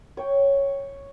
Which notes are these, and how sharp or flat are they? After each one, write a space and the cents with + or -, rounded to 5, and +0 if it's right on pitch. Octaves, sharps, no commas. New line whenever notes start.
C#5 +0 G5 +0